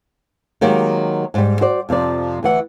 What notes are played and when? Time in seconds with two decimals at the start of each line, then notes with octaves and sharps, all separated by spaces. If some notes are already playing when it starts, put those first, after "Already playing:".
0.61 D#3 F#3 G#3 A#3 G4 A#4
1.34 G#2 G3
1.61 F#4 C5 D5
1.89 F2 C3 F3 D5
2.43 D2 E3 F#5